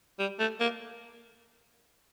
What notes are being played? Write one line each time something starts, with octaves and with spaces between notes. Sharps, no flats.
G3
A3
A#3